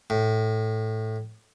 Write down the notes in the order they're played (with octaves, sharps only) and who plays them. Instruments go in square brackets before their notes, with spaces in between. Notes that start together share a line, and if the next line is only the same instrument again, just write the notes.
[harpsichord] A2